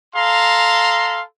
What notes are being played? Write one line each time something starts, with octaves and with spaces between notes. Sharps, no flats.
A4 F5 A#5 C6